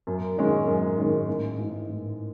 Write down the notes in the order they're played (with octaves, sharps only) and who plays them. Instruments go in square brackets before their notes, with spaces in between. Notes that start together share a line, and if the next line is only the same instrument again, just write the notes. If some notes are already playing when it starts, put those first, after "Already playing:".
[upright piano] F#2
D#3 G#3 C#4
F#2
D#3 G#3 C#4
A1
G#2 E3
A1